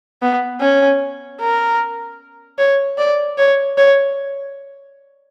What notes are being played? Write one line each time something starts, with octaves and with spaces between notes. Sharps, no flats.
B3
C#4
A#4
C#5
D5
C#5
C#5